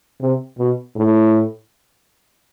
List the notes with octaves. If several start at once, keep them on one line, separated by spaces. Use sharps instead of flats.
C3
B2
A2